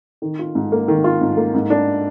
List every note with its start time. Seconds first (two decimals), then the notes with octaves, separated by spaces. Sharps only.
0.22 D#3
0.39 F4
0.55 G#2
0.72 A#3
0.88 D#3
1.04 F4
1.21 G#2
1.37 A#3
1.54 G#2
1.70 D4